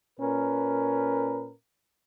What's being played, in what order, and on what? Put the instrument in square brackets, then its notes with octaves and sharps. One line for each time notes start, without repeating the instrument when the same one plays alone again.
[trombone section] A#2 C#4 A#4 B4